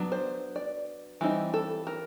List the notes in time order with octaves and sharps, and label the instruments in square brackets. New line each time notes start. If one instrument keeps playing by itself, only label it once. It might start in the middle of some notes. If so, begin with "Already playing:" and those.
Already playing: [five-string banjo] F#3 B3 D4
C5
D5
E3 G3 C4 D#4
A4
A#4